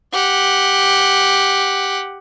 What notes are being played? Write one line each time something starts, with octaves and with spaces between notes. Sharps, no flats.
G4 F#5